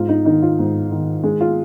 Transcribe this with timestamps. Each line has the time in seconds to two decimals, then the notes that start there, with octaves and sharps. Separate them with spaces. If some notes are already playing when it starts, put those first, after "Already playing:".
Already playing: G#2 F4
0.09 D#4
0.25 D#3 D#4
0.42 F4
0.59 G#2
0.91 D#3
1.24 G#3
1.41 F4